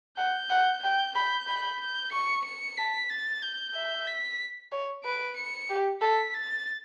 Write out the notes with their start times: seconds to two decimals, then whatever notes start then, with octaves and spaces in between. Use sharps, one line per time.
0.18 F#5 G6
0.50 F#5
0.83 G5 G6
1.15 B5 G6
1.48 B5
1.80 G6
2.12 C#6 C#7
2.45 C#7
2.77 A5 B6
3.10 A6
3.42 G6
3.74 E5
4.07 B6
4.72 C#5
5.04 B4 D7
5.36 C#7
5.69 G4
6.01 A4 B6
6.35 A6